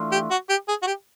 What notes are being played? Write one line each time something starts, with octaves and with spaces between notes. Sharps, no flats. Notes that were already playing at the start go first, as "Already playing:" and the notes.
Already playing: E3 A3 D4 F4
G4
F#4
G4
G#4
F#4
G4